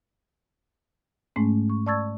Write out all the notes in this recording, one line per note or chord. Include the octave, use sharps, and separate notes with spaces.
G#2 G#3 A3 C#4
C#6
D5 A5 C#6 E6 G#6 A6